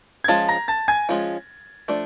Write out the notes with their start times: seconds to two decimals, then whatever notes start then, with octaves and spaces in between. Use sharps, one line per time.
0.24 G#6
0.28 F3 G#3 C#4 F4 A5 A6
0.49 A#5 A#6
0.68 A5 A6
0.88 G#5 G#6
1.09 F3 G#3 C#4 F4
1.88 F3 A3 D4